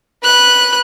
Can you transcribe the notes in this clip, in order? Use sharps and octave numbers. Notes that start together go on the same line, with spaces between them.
B4 F#6